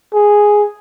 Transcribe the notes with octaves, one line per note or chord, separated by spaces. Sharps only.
G#4